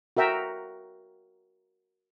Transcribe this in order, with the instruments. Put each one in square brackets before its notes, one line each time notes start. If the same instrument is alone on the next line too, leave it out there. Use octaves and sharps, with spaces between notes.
[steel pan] F#4 A#4 E5 G5 A#5